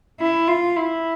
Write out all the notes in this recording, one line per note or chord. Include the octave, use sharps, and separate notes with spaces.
E4
F4
E4